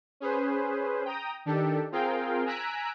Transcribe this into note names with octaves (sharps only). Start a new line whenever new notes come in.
C#4 G#4 B4 C5
G5 A#5 D#6
D#3 D4 G4 A4
C4 F4 G#4 A#4 F5 G5
G#5 A#5 E6 F#6 B6 D7